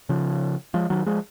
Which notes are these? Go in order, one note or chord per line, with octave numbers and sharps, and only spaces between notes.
C#3 F3
F3 G#3
D#3 F#3
F3 G#3